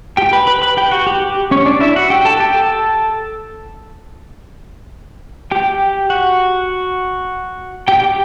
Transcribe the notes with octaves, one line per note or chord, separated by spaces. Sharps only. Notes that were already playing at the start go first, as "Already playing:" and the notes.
G4 G5
B4 B5
B4 B5
B4 B5
G4 G5
F#4 F#5
G4
G4
C#4 C#5
D4 D5
E4 E5
F#4 F#5
G4 G5
A4 A5
G4 G5
A4 A5
G4 G5
F#4 F#5
G4 G5
G4 G5